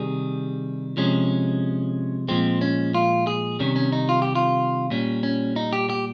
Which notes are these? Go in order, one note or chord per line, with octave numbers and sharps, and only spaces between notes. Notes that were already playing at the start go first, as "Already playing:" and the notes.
Already playing: C3 D#3 G3 G#4
C3 F3 G#3 C#4
A#2 F3 G#3 C4
C#4
F4
G#4
C3 D#3 G3 C#4
C#4
D#4
F4
G4
F4
A#2 G3 C#4
C#4
D#4
G4
G4